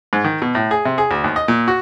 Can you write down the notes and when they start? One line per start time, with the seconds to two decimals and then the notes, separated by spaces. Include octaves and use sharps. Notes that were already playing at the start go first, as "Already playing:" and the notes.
0.13 G#2
0.24 D#3
0.42 B2
0.55 A2
0.71 G#4
0.85 C3
0.98 G#4
1.11 D2
1.24 D#2
1.36 D#5
1.48 A#2
1.68 F#4